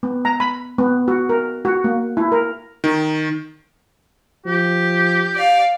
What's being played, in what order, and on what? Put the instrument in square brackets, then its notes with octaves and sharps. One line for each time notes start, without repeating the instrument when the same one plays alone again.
[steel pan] B3
A#5
B5
B3
F#4
A#4
F#4
A#3
E4
A#4
[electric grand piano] D#3
[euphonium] F3 [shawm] G4
[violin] D5 F5